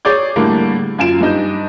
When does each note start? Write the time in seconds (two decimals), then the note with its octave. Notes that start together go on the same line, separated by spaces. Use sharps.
0.05 G#4 C#5 D5 D6 G6
0.36 A2 D3 G3 A3 A#3
0.98 F#2 F4 G#5 D7 E7
1.21 G2 G3 D#4 G6